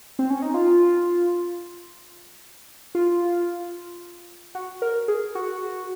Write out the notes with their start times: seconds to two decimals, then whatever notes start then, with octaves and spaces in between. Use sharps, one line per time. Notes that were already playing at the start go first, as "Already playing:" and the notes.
0.19 C4
0.30 C#4
0.42 D#4
0.54 F4
2.95 F4
4.55 F#4
4.82 A#4
5.08 G#4
5.35 F#4